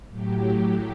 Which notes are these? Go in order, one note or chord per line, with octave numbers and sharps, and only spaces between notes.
A2 F#3 G4